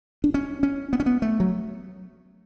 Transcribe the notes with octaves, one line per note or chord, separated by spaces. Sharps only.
D4
C#4
C#4
B3
C#4
B3
A3
F#3